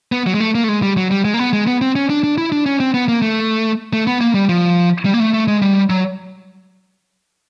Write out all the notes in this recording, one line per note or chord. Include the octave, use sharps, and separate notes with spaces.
B3
F#3
G#3
A3
A#3
A3
G#3
G3
F#3
G3
G#3
A#3
B3
G#3
B3
C4
C#4
D4
D4
E4
D4
C#4
C4
B3
A#3
A3
A3
B3
A#3
G3
F3
G3
A#3
A3
A3
G#3
G3
F#3